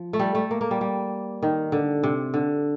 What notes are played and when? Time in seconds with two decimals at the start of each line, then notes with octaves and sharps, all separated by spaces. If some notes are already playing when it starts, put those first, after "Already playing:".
Already playing: F3
0.13 A3
0.19 G3
0.35 A3
0.51 A#3
0.61 A#3
0.71 G3
0.81 G3
1.43 D#3
1.72 D3
2.04 C3
2.34 D3